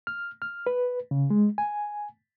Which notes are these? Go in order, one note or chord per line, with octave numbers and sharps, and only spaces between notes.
F6
F6
B4
C#3
G#3
G#5